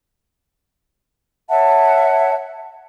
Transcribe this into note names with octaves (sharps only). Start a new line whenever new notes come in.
C#5 E5 F#5 A5